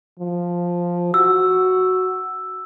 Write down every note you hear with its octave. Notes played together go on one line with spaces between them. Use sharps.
F3
F#4 E6